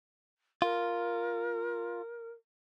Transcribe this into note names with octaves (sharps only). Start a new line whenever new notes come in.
F4 A#4